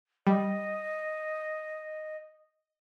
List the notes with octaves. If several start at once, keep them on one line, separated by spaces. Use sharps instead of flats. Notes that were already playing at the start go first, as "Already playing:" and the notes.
G3 D#5